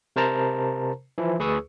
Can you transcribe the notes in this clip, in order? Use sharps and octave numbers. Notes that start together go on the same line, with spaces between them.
C3 A#4 C5 A5 A#5
E3 F3 E4
D2 G#4 B4 C#6 D#6 E6